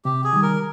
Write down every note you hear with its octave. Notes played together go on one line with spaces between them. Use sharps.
C3 G4
G#4
D#3 G3
A#4